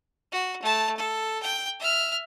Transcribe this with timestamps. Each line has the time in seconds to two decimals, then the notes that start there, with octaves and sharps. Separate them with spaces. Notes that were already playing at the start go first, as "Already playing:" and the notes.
0.32 F#4
0.62 A3 A5
0.97 A4
1.43 G5
1.80 E5 F6